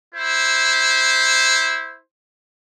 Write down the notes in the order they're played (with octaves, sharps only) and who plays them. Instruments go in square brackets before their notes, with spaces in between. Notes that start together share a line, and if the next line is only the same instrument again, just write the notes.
[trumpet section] E4 C5